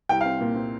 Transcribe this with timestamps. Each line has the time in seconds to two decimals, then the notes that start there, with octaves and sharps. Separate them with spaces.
0.09 C2 G5
0.21 F5
0.25 C4
0.41 A#2
0.56 C4